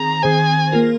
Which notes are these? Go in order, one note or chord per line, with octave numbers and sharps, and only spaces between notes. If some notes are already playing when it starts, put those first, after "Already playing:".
Already playing: D#3 C4 G#4 A#5
D#3 C4 G#4 C5 G#5
A#3 F4 A#4